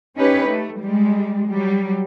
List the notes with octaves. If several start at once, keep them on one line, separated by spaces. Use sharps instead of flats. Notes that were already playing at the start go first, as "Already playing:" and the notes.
C#4 D#4 G4 B4 C#5
A3
G3 G#3
F#3 G3